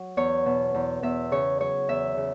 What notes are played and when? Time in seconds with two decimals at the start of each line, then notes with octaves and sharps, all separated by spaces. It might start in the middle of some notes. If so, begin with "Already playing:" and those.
Already playing: F#3
0.17 E2 C#5
0.46 B2
0.74 E2
1.03 E2 E5
1.31 C#3 C#5
1.60 F#3 C#5
1.89 E2 E5
2.17 C#3